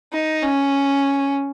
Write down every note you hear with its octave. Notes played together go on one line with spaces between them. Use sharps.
D#4
C#4